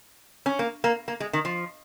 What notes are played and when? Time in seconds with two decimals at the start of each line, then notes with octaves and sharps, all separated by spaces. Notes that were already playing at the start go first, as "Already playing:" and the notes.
0.46 C#4
0.59 A#3
0.84 A#3
1.08 A#3
1.20 G#3
1.33 D#3
1.45 F3